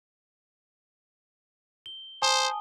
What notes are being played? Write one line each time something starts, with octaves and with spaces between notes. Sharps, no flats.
G7
C5 G#5 A5 D#6